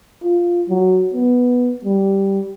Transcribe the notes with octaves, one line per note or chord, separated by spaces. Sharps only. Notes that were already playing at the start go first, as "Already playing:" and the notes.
F4
F#3
B3
G3